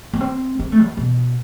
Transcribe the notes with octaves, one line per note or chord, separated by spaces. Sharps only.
B3
C4
C4
A3
B2
B2